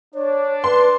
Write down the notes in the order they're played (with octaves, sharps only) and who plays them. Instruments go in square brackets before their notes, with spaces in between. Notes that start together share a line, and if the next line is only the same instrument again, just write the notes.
[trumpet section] D4 [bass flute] C#5
[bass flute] B4 [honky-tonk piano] C6